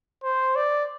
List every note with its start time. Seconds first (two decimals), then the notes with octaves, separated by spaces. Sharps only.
0.23 C5
0.55 D5